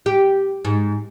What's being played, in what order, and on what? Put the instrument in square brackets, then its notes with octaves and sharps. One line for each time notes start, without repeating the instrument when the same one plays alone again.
[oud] G4
G#2